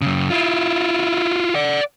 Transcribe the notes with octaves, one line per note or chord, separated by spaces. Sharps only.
F#2 C#3
E4 F4
D5 F#5